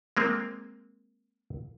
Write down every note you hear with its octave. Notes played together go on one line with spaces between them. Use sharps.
G#3 A#3 C4